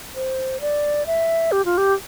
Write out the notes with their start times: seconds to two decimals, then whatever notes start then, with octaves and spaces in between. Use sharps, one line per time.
0.15 C5
0.61 D5
1.06 E5
1.52 G4
1.65 F4
1.78 G4